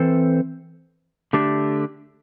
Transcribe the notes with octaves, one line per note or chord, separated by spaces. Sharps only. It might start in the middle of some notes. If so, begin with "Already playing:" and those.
Already playing: E3 C4 A4 C5
D3 A3 D4 G4